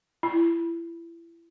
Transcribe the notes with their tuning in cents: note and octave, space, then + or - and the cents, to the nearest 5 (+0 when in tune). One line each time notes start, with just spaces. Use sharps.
E4 +30